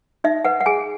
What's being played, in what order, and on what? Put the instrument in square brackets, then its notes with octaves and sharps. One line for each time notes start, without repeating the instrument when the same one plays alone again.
[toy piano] D#4 E5
B4 F#5
F#5
G#4 G#5